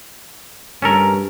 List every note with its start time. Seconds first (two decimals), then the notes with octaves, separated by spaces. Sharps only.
0.82 G2 C#4 A4 A#4